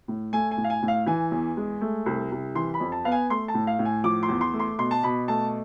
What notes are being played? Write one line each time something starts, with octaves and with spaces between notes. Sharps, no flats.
A2
A3 G#5
G#5
A2
F5
G#5
A2
F5
E3 G#5
E2
G#3
A3
C2
C2
E3 C6
B5
F2
A5
B3 F5
G#5
A3 C6
A5
A2
F5
A2
G#5
F3 D6
C6
E2
C6
A3
C6
B2 C6
A5
B2 B5
A3 A5